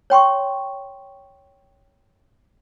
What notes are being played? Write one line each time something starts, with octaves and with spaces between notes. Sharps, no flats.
C#5 G5 C6 C#6